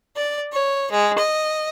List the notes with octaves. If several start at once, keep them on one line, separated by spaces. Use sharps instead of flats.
D5
C#5
G#3
D#5